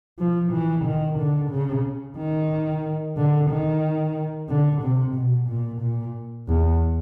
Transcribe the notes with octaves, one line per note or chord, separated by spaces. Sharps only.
F3
E3
D#3
D3
C#3
D#3
D3
D#3
D3
C3
B2
A#2
A#2
E2